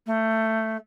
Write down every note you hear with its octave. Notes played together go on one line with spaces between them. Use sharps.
A3